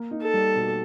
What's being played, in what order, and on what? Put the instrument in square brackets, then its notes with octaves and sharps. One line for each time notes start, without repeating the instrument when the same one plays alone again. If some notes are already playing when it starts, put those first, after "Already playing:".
Already playing: [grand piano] A#3
D#4
[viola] A4
[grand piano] G3
B2